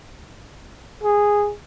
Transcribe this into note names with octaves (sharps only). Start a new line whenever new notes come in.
G#4